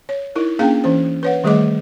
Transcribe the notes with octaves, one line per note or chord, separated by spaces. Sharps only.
C#5
D#4 E4 A#4
A#3 C#4 D4 G#4 F5 G5
E3 C#4 C5
B4 C#5 F#5
D#3 G3 A3 G#4 D#5 D6